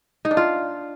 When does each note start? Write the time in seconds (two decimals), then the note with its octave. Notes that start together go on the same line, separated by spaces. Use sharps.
0.25 D#4
0.31 D4
0.37 F4